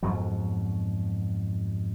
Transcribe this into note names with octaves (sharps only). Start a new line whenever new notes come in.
F2 G#2 B2 F#3